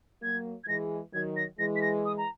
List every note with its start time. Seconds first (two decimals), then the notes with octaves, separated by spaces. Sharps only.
0.22 F#3 A#3 G#6
0.63 G#6
0.67 E3 G#3 A#6
1.13 D#3 F#3 G#6
1.36 A#6
1.58 E3 G#3 A#6
1.75 B6
1.81 A#6
2.05 D#6
2.17 A#5